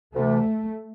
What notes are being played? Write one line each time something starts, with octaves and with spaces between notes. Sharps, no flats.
D2 C3 E3 A3